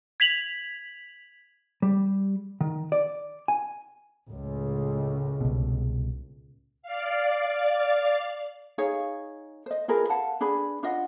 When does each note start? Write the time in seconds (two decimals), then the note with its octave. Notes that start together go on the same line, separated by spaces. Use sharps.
0.20 G#6 B6 F7 F#7
1.82 G3
2.61 D#3
2.92 D5
3.48 G#5
4.27 C#2 A2
5.41 C2 B2
6.82 D5 F5
8.78 D#4 G#4 C#5 F5
9.66 C5 D#5
9.88 F4 G#4 A#4 B4
10.10 F5 F#5 A5
10.41 D4 G#4 B4 B5
10.83 D4 F4 D#5 F#5